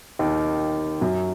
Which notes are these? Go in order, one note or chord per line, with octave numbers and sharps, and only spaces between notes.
D#2 D#3
F#2 F#3